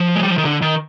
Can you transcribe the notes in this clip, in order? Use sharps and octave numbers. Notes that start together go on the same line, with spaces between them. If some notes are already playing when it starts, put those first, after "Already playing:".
Already playing: F3
G#3
G3
F3
D#3
D3
D#3